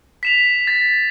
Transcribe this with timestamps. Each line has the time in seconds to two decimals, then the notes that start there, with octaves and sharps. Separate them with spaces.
0.23 B6 E7 F7
0.67 A6